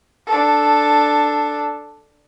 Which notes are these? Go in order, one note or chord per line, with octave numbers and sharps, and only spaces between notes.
D4 A4